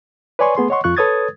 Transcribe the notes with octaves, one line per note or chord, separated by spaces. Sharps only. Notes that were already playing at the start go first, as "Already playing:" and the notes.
B4 C#5 D5 G#5 C6 C#6
A3 B3 G#4 C6
C#5 D#5 F#5 C6 C#6
F2 F4 C#6 F#6
A4 B4 C#5 D#6 G#6 A6